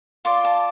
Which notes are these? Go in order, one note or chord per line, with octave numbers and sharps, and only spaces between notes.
F4 D5 C6
A5